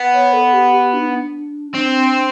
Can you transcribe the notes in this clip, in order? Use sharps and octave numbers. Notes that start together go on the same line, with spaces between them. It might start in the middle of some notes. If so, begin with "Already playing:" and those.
Already playing: B3
C#5
A4
G4
G4
D4
D#4
D4
C4 D4